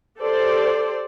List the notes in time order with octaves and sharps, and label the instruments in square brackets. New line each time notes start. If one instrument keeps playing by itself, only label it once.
[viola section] G4 A4 C5 D5